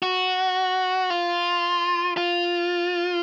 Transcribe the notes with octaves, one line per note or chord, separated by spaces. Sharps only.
F#4
F4
F4